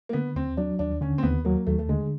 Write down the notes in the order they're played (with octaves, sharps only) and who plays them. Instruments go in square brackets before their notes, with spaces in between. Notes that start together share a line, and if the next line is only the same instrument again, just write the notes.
[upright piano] A#3
[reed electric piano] D3 [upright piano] B3
[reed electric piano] D#2 [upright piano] C4
[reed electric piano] F#3 [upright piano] D4
[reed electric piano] D#2 [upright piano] D4
[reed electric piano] D3 [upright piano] C#4
[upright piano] C4
[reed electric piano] D#2 [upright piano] B3
[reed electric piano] F#3 [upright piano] A#3
[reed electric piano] D#2 [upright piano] A3
[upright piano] A3
[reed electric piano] D3 [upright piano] G#3